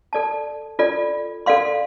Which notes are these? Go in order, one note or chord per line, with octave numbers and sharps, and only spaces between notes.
A4 D5 A5
F4 A4 D5
A4 D5 F5 C6